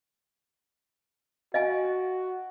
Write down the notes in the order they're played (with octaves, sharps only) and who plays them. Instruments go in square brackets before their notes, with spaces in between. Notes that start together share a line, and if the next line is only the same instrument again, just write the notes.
[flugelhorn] F#4 [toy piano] D#5 F5 G#5